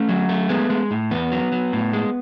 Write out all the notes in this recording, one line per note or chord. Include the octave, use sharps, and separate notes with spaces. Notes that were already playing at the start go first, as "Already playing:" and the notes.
Already playing: A3 C#4
F#3
A3
G#3 B3
G#3
A2
E2 B3
F#3
F#3
A2
G#3